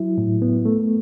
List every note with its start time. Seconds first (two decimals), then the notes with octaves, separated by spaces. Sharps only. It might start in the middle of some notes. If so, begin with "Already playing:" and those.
Already playing: F#3 E4
0.18 A2
0.42 B3
0.65 A3